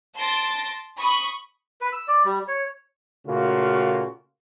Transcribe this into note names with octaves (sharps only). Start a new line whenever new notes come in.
A5 C6 A6 A#6 D7
B5 C#6 D#6
B4
E6
D5
G3
C#5
A#2 C#3 A3 A#3 F4 F#4